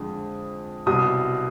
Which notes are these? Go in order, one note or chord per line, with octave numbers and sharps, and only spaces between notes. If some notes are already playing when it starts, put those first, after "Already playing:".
Already playing: F2 D3 G#3
C2 B2 G3 D#6